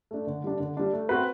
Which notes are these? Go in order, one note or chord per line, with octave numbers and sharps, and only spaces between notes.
A3 D4
D3
G3 D4
D3
G3 D4
A3
C4 F#4 B4